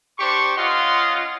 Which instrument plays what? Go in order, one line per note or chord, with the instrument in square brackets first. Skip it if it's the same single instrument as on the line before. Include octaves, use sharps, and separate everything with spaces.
[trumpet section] D4 G4 C5 C#6
C#4 F4 D#5 F5 F#5 C6